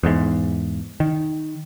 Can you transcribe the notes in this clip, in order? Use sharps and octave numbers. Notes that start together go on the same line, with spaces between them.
E2 G#2
D#3